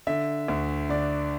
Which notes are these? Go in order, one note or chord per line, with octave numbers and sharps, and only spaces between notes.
D3 E5
D2
D3 D5